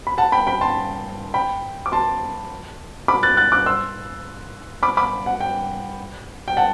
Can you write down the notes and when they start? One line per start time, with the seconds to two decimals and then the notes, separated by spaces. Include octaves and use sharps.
0.07 B5
0.18 F#5 A5
0.32 G5 B5
0.47 G5 B5
0.61 A5 C6
1.34 G5 B5
1.86 D6
1.92 A5 C6
3.08 B5 D6
3.23 F#6 A6
3.37 F#6 A6
3.52 D6 F#6
3.66 C6 E6
4.83 B5 D6
4.97 B5 D6
5.26 F#5
5.40 G5
6.48 G5
6.57 F#5 A5